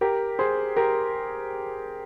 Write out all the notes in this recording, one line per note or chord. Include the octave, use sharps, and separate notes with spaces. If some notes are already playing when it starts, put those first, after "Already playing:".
G4 A#4
G#4 C5
G4 A#4